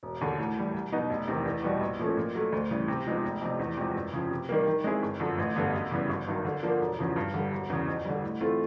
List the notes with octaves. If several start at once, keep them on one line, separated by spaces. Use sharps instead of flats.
E1
D#2 D3
A2
E3 G3
C2
B2 F#3 B3 D#4
F1
E2 C3 D#3
E2
B2 G3 B3
A#1
A#2 F3 A3 C#4
A#2
F#3 A3
D2
C#3 E3 G3
C3
F3 G#3 B3 D#4
F1
F2 C3
E2
C3 F3 G#3
F#2
C#3 F3
C3
D#3 G3 A#3
D#3
G#3 C4 E4 G#4
G1
F#2 D3 F3
A1
G2 D3 G3 B3
F#2
C#3 E3 G3 B3
G1
G2 D#3 F#3
D3
F3 A#3 D4
E1
E2 C#3 F3
G2
D3 G3
E1
E2 C#3
F2
D3 G3
A2
E3 A3 C4 F4